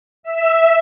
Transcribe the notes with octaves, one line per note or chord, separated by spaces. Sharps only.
E5